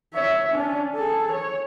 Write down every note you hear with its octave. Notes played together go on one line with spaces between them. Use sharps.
C#5 E5
C#4 D4
G#4 A4
C#5